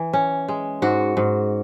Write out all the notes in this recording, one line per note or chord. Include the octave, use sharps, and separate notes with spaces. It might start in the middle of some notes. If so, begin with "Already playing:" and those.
Already playing: E3
C#4
G#3
G#2 F#4
G#2